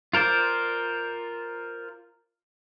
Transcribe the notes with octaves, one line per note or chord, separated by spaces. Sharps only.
F4 A#4 C5 D5